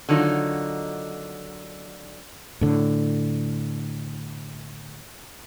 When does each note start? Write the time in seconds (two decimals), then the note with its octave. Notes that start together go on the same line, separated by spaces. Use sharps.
0.09 D3 D#3 F#3 D#4 F4
2.61 A2 D3